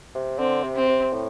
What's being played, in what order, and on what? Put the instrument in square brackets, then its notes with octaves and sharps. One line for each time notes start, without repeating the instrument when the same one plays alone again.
[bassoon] C3
[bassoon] D3 [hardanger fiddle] C4
[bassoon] C3
[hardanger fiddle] C4
[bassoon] C3
A2